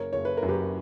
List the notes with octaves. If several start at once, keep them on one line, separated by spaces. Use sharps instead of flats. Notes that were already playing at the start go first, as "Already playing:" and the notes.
Already playing: F#1 A#4 C#5
F#1 C#5
B4
A#4
F#2
G4 B4